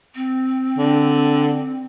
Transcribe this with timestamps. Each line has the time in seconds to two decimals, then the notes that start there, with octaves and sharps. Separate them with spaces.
0.15 C4
0.78 D3